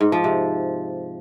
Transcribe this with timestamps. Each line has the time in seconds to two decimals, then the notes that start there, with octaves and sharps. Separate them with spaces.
0.01 G#2
0.12 F3
0.24 C3